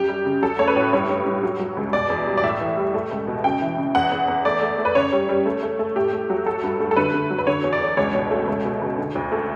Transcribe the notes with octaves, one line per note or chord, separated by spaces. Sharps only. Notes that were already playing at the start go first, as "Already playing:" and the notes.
Already playing: F#2 G4
G3
C#3
F#3 A4
A3 C#5
B4
A2
G2 C#5
G2
G2
F#3
F#3
C#2
B2 D5
E2
G3
D5
A2 E5
E3
G3
A3
C#2
B2
C#3 G5
E3
C#3
E2 F#5
E2
E2
A3 D5
A3
A3
B4
C#3 C#5
G3
G3
A3
A3
A3
A2 G4
A3
F#3
A3 A4
G2
A3
A4
D3 B4
D3
F#3
B4
D3 C#5
E2
D5
E2
C#2 C#5
B2
A3
C#2
B2
C#2
D3
D2
A3